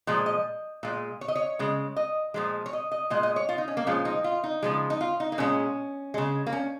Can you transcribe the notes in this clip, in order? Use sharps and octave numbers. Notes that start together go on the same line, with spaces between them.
A#2 F3 G#3
D#5
A#2 G#3
C#5
D#5
C#5
C#3 G#3
D#5
A#2 F3 G#3
C#5
D#5
D#5
A#2 G#3 D#5
D#5
C#5
F4
D#4
C#4
A#3
A#2 F3 G#3 C#4
D#4
F4
D#4
C#3 F3 G#3
D#4
F4
D#4
A#3
A#2 G#3 C#4
C#3 G#3
A#3
C#4